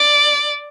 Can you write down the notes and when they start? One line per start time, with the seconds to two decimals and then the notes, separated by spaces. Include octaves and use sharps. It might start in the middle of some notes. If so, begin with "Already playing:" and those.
Already playing: D5